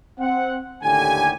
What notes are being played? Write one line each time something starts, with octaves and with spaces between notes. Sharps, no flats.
C4 F#5
D#2 A2 D3 G4 G#5